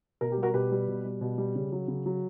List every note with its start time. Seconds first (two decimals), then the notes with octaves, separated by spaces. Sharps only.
0.21 B2 A#4
0.32 G4
0.38 G3
0.43 F#4 A#4
0.54 B2 G4 B4
0.72 G3
0.88 B2
1.04 G3
1.21 B2
1.38 G3
1.55 C#3
1.72 F#3
1.88 C#3
2.06 F#3